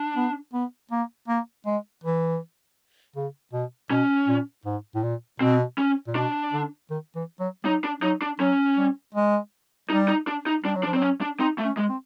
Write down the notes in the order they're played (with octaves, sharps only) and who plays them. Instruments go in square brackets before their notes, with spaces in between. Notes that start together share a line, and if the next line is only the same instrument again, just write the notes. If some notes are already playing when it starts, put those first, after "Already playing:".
Already playing: [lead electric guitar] D4
[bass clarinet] B3
B3
A#3
A#3
G#3
E3
C#3
B2
[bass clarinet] B2 [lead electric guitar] C#4
[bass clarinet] A#2
G#2
A2
A#2
[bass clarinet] B2 [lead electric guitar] C4
[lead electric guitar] C#4
[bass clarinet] A#2
[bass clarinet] B2 [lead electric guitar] D4
[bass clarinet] D3
D#3
E3
F#3
[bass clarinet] F#3 [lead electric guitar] D#4
[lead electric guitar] D4
[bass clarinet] F#3 [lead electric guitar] D#4
[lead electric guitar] D4
[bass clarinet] F#3 [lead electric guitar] C#4
[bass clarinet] G3
G#3
[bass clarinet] G3 [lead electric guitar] D#4
[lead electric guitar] D#4
D4
D#4
[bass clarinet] G3 [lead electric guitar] D4
[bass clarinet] F#3
[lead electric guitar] D4
[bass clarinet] F3
[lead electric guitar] C4
[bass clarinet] F#3 [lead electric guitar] C#4
[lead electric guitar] D4
[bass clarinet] C4 [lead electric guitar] D#4
[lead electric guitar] A3
[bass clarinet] C#4
[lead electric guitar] G#3
[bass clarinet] C4